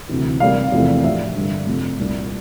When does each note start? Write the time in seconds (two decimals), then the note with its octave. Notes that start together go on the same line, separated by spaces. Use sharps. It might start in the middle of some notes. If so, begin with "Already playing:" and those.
0.09 D2 C3 E3
0.40 C3 G3 A#3 F5
0.72 E2 C3 F3 A3 E4
1.04 A2 F3 A#3 D4 E5
1.35 G2 D3 G3 D4
1.67 F2 C3 F3 A3
1.98 C2 A#2 G3 D4